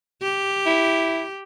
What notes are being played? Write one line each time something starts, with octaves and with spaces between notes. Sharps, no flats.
G4
E4